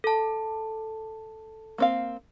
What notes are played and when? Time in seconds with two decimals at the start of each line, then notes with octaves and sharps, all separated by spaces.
0.04 A4 A5
1.78 A#3 C4 F5